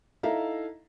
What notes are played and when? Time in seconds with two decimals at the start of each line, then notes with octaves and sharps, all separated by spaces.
0.23 D#4 E4 A4 E5 F5 A#5